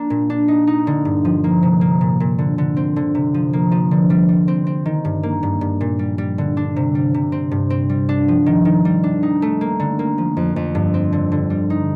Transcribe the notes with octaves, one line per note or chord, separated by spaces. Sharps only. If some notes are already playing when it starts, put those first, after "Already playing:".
Already playing: A#3 D4
A#2
D4
D#4
D#4
D3
G2
F3
A#3
C3
A#3
A#2
A#2
D3
D3
C4
D3
C3
F3
A#3
F3
D3
G3
G3
C4
C4
D#3
G2
A#3
G2
G2
A#2
G3
G3
D3
D4
C3
G3
C3
C4
G2
C4
G3
D4
F3
D#3
D#3
G3
D4
D#4
A3
A#3
D3
A#3
F3
F2
F2
G2
C4
D3
D3
G3
D#4